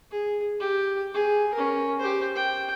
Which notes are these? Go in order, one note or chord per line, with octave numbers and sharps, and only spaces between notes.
G#4
G4
G#4
C#4 A#4
G4 C5
G5